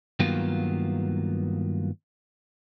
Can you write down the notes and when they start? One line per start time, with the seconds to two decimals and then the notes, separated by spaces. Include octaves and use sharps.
0.19 G2 D#3 F#3 A#3 B3 F4